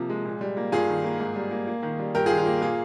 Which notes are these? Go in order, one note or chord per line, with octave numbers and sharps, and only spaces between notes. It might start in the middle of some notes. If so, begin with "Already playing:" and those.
Already playing: C3 F3 A#3
G#3
A#2
G3
A#3
G2 F4 G#4
D#3
A#3
G#2
G3
A#3
A#3
D#3
G3
G2 G4 A#4
D#3 F4 G#4
F4
A#3
A#2 F4 G#4